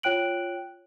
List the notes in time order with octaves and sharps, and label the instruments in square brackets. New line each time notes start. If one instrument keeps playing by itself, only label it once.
[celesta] F4 C#5 G5 F#6 D7 F#7